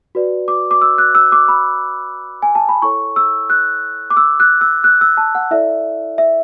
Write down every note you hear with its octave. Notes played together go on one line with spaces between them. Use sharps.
F#4 B4 D5
D6
D6
E6
F#6
E6
D6
B5
G#5
A5
B5
E4 A4 C#5 C#6
E6
F#6
D6
E6
F#6
E6
F#6
E6
A5
F#5
E4 A4 D5 E5
E5